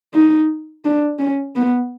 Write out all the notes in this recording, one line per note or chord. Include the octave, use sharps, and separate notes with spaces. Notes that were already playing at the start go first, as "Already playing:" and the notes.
D#4
D4
C#4
B3